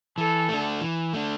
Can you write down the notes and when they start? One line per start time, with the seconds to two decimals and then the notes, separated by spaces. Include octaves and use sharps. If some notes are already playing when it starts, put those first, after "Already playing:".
0.18 E3 A4
0.49 A3 D4
0.81 E3
1.13 A3 D4